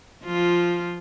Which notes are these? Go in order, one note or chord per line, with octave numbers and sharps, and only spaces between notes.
F3 F4